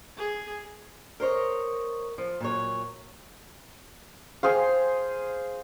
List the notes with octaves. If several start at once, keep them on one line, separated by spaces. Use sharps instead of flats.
G#4
A#4 C5 C#5 D#5
F3
A#2 F#3 C#5
G#4 C5 F5